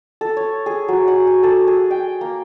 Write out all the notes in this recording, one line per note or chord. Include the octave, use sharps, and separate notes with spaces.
A4
C#5
G#4
F#3
F#5
G#5
A4
G#4
G5
A#3